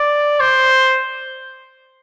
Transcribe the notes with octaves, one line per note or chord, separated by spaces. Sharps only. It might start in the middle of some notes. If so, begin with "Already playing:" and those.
Already playing: D5
C5